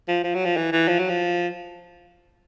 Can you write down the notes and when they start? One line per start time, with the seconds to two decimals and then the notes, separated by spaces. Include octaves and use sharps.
0.08 F3
0.24 F3
0.35 F#3
0.45 F3
0.57 E3
0.73 E3
0.88 F3
0.99 F#3
1.09 F3